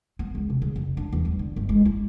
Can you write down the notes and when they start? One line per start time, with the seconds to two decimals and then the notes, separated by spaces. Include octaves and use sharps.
0.19 B3
0.35 C#2
0.50 C3
0.62 C#3
0.76 F2
0.97 D4
1.12 E2
1.25 G3
1.39 D3
1.56 G1
1.69 G#3
1.85 E4